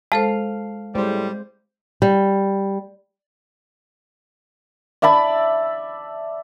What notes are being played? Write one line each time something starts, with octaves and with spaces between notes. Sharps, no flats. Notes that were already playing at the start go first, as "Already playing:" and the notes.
G#3 A4 C5 F5 A5
A2 G3 G#3 C5
G3
D5 E5 A5 B5